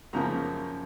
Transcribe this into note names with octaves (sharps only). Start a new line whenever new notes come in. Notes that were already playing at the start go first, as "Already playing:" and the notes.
F#2 C#3 F3 A#3 A#5